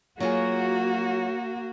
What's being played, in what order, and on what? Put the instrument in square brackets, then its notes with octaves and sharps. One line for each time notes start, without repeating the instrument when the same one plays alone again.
[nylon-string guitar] F#3 F4 G#4 [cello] A#3 F#4